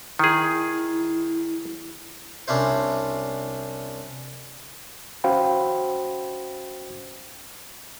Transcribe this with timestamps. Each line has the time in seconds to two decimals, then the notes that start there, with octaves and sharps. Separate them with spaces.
0.19 D#3 E4 G#4
2.48 C2 C#4 D4 E4 C5
5.24 C#4 F#4 C5 F5 G5 B5